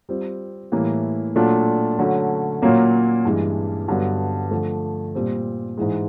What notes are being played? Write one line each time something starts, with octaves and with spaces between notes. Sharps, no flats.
G3 C4 F4
A2 E3 G3 A#3
A#2 F#3 A3 D4 F4
D3 F#3 A3 C#4
A#2 F#3 A#3 C#4
G2 E3 G#3
G2 D3 F#3 B3
D3 F3 A3
A#2 G3 C4
G#2 E3 G#3